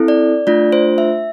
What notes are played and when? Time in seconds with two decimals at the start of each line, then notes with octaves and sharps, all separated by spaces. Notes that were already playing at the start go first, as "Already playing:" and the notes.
Already playing: C4 E4 A4
0.08 D5
0.47 A3 D4 F4 D5
0.73 C5
0.98 E5